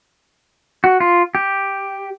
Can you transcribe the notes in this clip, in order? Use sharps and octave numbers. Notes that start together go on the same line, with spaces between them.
F#4
F4
G4